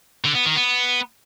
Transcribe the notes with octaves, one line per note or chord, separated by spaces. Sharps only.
D3
B3
D#3
B3